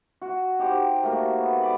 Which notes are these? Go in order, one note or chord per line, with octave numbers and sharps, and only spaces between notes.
F#4
D#4 G4 C5
A3 A#3 F#4
B3
D5 B5 D6